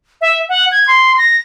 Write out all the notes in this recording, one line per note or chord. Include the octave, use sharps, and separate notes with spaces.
E5
F#5
G#6
C6
A#6